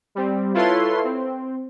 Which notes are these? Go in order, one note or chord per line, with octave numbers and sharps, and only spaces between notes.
G3 C4
E4 F4 A4 B4 C#5 C6
C4